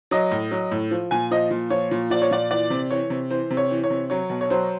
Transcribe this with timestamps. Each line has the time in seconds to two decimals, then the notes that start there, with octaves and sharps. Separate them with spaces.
0.11 F#3 D#5
0.31 A2
0.51 F#3
0.71 A2
0.91 F3
1.11 A#2 G#5
1.31 F3 D#5
1.51 A#2
1.70 F3 C#5
1.91 A#2
2.10 F3 D5
2.22 C#5
2.31 A#2 D5
2.51 E3 D5
2.70 C3
2.91 E3 C#5
3.10 C3
3.30 E3 C5
3.50 C3
3.57 C#5
3.71 E3
3.84 C#5
3.90 C3
4.10 F#3 C#5
4.30 B2
4.41 C#5
4.50 F#3 C5